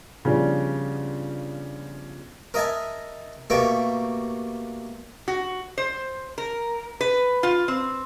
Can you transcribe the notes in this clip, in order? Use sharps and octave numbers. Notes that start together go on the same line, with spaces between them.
C#3 F3 G3 B3 C#4 D4
A#4 D#5 E5 G#5 A5
B2 A3 A#3 G4 G5
F#4
C5
A#4
B4
F4
C4